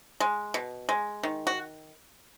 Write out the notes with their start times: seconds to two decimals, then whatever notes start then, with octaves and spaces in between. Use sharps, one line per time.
0.20 G#3
0.54 B2
0.89 G#3
1.23 D#3
1.47 F#4